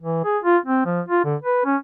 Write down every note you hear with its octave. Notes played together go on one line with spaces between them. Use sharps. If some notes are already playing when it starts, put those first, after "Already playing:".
E3
G#4
F4
C4
F3
F4
D3
B4
C#4